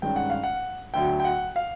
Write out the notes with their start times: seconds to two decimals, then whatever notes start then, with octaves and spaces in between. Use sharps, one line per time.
0.02 G2 D#3 G#3 C#4 G5
0.16 F#5
0.30 F5
0.43 F#5
0.94 D2 D3 F#3 G5
1.20 G5
1.25 F#5
1.56 F5